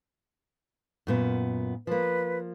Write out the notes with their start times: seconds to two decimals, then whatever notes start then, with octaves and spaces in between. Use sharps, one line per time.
1.07 F#2 A#2 B3
1.87 F3 A#3 B4